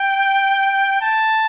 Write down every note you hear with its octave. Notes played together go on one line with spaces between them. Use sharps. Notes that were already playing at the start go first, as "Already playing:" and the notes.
Already playing: G5
A5